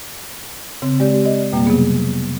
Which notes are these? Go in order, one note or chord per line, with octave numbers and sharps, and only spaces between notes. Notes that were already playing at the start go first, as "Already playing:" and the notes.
C#3 C4
G#3 G4 D5
D5 D#5
F2 B2 G3 A#3
C3 F#3 B3 G#4